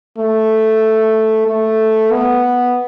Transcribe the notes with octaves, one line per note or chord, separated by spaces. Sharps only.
A3
A3
B3